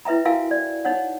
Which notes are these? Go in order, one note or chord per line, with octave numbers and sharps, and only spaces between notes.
E4 B4 E5 G5 A#5
E4 F#4 A#4 F5 G5 G#5
D5
D#4 C#5 F#5